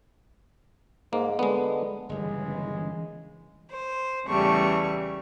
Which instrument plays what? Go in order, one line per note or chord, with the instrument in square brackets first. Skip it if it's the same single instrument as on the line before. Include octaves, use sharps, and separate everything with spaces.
[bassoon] G#2 [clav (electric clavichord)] A#3
[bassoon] D3 [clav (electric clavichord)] G#3 B3
[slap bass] G1 A#2 G3 [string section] C#3 E3 [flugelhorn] G#3
[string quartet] C5
E2 C#3 E3 G3 A3 C#6